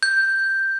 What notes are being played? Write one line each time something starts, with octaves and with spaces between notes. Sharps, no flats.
G6